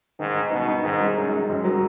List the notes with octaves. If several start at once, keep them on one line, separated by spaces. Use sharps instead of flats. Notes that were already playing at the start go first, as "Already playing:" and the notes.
G#2 D#3
D#3
B2 D#4
D#4
G#2 D#3
G#3
F#2 D#4
G#3
F#2 D#3
F#3